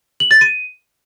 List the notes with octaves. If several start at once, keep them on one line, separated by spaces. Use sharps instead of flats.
F#7
A6
D#7